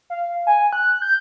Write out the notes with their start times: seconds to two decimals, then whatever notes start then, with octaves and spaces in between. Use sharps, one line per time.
0.10 F5
0.47 G#5
0.73 F#6
1.02 G6